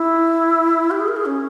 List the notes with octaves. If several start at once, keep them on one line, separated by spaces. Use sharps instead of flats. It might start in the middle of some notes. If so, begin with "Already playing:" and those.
Already playing: E4
G4
G#4
A#4
G#4
C#4